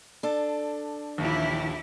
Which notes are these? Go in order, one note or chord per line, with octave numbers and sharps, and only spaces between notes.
D4 A4
A#1 D#2 E3 E4 G4